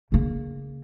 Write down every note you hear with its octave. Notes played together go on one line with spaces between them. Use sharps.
C#3 A#3